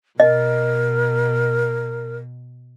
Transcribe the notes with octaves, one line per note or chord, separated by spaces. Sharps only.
B2 A#4 D#5